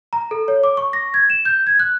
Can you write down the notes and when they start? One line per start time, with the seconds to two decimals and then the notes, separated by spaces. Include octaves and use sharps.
0.13 A#5
0.31 A4
0.48 C#5
0.64 D6
0.77 C#6
0.93 A#6
1.14 G#6
1.30 E7
1.45 G6
1.67 G#6
1.79 F#6